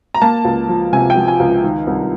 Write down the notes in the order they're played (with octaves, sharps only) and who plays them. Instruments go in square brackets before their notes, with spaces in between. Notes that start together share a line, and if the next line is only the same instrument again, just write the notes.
[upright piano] A#5
A#3 A5
C#2
F3
C3 G#5
G5
F3
G#5
C#2
D#3
C2